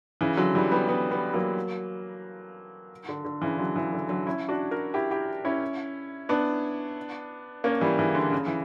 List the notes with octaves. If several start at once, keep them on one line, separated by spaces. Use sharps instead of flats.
C#3 E3
D3 F#3
E3 G3
G3 B3
G3 B3
G3 B3
F#3 A#3
D3
D3
C#3 E3
D3 F#3
C#3 E3
D3 F#3
D3 F#3
C#4 E4
D4 F#4
F#4 A#4
E4 G4
E4 G4
C#4 E4
B3 D4
A#3 C#4
E3 G3
C#3 E3
D3
C#3
E3